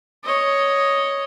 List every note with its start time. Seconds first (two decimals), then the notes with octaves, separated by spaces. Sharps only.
0.24 C#5 D#5